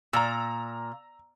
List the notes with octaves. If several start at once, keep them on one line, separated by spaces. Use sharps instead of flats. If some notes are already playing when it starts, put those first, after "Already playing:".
A#2 A#5 E6